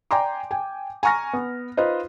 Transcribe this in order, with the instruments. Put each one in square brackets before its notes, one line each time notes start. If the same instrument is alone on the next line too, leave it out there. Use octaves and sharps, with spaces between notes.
[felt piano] D5 G5 G#5 A#5 C6 D6
G5 G#5
G#5 A#5 C#6 F6 A#6
B3
D#4 F4 B4 C5 D#5